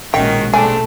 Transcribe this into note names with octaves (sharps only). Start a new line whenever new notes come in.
A#1 B2 D#3 G#3 C#4 F#4 G5
C#3 A3 C4 D4 G#5 A5